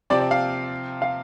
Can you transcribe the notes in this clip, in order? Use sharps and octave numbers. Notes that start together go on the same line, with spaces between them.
C3 F3 C4 G4 D5
D5
F5
F5